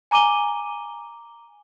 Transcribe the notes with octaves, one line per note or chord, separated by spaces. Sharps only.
G#5 A#5 D6 D#7 G7